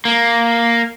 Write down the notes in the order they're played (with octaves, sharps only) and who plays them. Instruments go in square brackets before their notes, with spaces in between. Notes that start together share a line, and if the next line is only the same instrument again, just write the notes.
[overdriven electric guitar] A#3